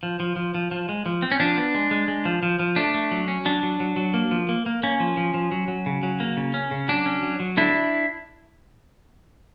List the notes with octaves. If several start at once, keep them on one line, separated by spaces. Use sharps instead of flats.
F3
F3
F3
F3
F3
G#3
F3
C4
C#4
F3 D4
B3
G#3
G#3
G#3
F3
F3
F3
A3 D4
A3
F#3
C#4
F#3 D4
F#3
F#3
F#3
A#3
F3
A#3
A#3
A#3 C#4
F3
F3
F3
F#3
F#3
C#3
F#3
A#3
C#3
C#4
C#3
F#3 D4
C#4
F#3
F#3
D3 D4 E4